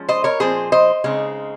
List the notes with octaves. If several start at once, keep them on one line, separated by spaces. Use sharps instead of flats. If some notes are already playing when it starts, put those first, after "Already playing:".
Already playing: F3 G#3 C#4
C5 D#5
A#4 C#5
A#2 F3 C4 G#4 C5
C5 D#5
C#3 G#3 C4 D#4